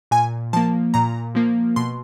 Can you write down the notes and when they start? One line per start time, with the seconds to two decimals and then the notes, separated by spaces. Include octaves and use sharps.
0.11 A#2 G#5
0.53 F3 A#3 A5
0.94 A#2 A#5
1.35 F3 A#3
1.76 B2 C6